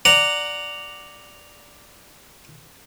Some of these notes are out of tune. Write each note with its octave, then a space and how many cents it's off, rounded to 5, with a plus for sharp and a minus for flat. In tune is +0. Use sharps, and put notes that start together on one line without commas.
D5 +0 F#5 +0 A#5 -10